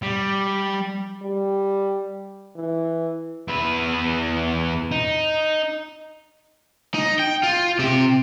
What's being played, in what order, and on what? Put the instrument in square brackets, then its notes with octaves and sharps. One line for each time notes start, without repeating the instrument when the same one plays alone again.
[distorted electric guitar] G3
[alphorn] G3
E3
[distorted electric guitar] E2 B4
D#4
[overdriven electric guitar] D#4
G5
F4
C3 G4